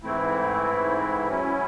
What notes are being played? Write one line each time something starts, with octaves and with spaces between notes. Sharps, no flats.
G#2 E3 A3 C4 E4
F#3 C#4 E4